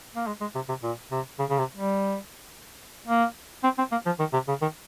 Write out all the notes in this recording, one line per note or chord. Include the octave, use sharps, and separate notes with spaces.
A#3
G#3
G#3
C3
C3
A#2
C3
C#3
C#3
C3
G3
A#3
C4
C4
A#3
F3
D#3
C3
C#3
D#3